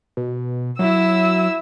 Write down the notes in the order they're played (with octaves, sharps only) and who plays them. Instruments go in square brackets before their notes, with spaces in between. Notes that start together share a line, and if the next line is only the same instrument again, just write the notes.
[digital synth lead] B2
[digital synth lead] F#3 [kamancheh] E4 E6